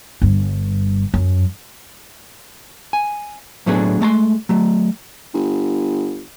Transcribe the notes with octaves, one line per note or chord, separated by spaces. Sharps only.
G1 G2
F#2
G#5
A2 F#3 A3 B3 D4 G#4
G#3 A3 A5 C6
F#3 A3
G1